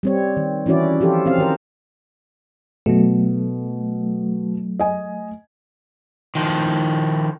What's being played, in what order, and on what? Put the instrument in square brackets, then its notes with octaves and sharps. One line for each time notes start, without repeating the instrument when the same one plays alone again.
[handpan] G3 C4 C#5
D#3
E3 C#4 E4 F#4 D5
F3 F4 G4 A4
C4 C#4 F5
D#3 A#4 C5
[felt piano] B2 [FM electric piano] F#3 A3
[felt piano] D#5 G#5
[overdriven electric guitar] D#3 F3